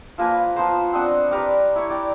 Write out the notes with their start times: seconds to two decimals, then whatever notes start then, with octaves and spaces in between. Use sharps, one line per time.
0.18 F3 A#3 B4 G#5
0.55 F3 B3 C5 A#5
0.93 C4 D4 D#5 F#5
1.31 G4 A#4 B4 D5
1.75 E4 C#5
1.90 D5 G5 A#5